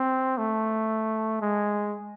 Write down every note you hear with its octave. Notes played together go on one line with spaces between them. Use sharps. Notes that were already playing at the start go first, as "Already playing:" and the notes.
Already playing: C4
A3
G#3